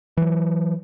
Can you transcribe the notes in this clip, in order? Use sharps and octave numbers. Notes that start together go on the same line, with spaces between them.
E3 F#3